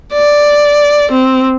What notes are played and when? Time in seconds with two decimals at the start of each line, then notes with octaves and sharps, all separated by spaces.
0.13 D5
1.11 C4